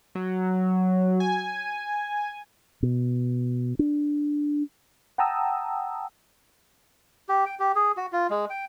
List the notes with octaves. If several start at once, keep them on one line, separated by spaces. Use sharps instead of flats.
F#3
G#5
B2
D4
F#5 G5 A5 A#5 D#6 E6
G4
G5
G4
G#4
F#4
F4
G#3
G5